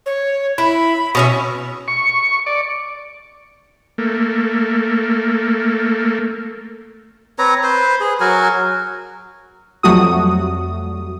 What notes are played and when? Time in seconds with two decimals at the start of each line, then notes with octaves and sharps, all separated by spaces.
0.06 C#5
0.58 E4 B5
1.15 B2 C#4 F#4 E5
1.88 C#6
2.46 D5
3.98 A3 A#3
7.39 C4 B4 C#5 A#5
7.63 B4 C5
8.00 G#4
8.20 F#3 F#4 A#4 G#5
9.83 F2 F#3 G3 A3 F#4 D#6